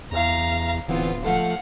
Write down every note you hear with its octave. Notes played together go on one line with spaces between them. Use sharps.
E2 F5 A#5
D1 D3 E3 B3 C4 F4
F3 A3 A4 F5 F#5